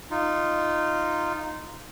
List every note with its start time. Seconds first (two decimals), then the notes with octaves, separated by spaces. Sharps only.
0.11 D#4 F4